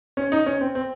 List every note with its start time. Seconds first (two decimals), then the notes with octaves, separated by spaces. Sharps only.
0.17 C#4
0.32 D#4
0.46 C#4
0.61 C4
0.75 C4